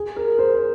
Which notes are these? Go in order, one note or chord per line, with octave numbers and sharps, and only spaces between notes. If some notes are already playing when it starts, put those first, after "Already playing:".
Already playing: G#4
A#4
C5
C5